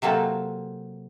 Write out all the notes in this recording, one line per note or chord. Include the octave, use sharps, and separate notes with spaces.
C3 F#3 A#3 C4 A4